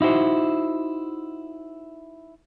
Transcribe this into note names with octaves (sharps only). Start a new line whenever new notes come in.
D#4 E4 F#4 C5